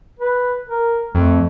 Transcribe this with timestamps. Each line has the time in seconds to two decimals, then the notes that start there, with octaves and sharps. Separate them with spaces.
0.19 B4
0.69 A#4
1.15 F2 A3